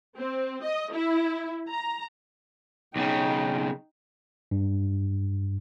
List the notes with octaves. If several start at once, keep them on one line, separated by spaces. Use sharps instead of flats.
C4
D#5
E4
A#5
B1 C#3 D#4 G5
G2